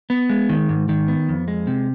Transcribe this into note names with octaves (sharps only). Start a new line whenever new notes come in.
B3
G#3
D#3
G#2
D#3
B3
F2
G#3
C3